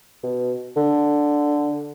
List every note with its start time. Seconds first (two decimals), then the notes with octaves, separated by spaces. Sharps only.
0.24 B2
0.77 D3